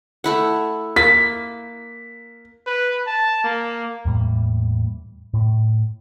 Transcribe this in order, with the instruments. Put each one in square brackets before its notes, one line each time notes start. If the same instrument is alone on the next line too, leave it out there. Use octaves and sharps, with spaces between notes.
[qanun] A3 E4 F#5
[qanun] A#3 [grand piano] B6
[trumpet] B4
A5
A#3
[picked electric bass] E2 A2 G3 A#3
A2